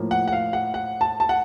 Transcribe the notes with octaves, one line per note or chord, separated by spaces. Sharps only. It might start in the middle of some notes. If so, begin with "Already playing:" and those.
Already playing: A2 F3 A#3
F#5
F#5
F5
F#5
F#5
A5
A5
F#5